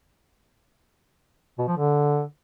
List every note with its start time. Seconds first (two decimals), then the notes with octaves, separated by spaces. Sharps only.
1.58 B2
1.68 F3
1.77 D3